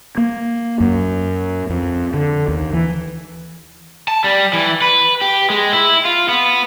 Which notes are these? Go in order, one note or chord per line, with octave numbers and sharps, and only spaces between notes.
A#3
F#2
F2
D3
D#2
E3
A5
G3
E3
B4
G4
G#3
E4
F4
B3